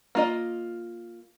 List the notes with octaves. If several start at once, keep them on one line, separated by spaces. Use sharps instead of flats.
A#3 F4 D#5